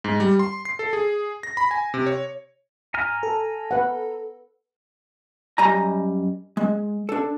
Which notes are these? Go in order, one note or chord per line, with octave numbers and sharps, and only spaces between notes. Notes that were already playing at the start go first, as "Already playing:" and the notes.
G#2
G3
C6
C7
A4
G#4
A#6
B5
G#5
C3
C#5
G#5 A#5 F6
A4
B4 F#5
F#2 G3 D#5 G#5 A#5
G#3
D4 A4